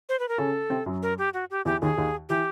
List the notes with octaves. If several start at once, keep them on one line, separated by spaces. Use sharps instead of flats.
C5
B4
A#4
C#3 C#4 A4
C3 C4
F#2 F#3
A#4
G4
F#4
G4
E2 E3 G4
D#2 D#3 G#4
D#2 D#3
E3 G4